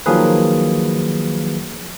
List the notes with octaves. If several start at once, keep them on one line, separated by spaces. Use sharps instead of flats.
D#3 F3 F#3 A#3 G#4 B4